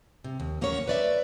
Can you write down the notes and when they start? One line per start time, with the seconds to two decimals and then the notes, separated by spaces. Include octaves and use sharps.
0.24 C3
0.40 D#2
0.61 D2 A#3 C#4 F#4 C#5
0.88 B4 D5 E5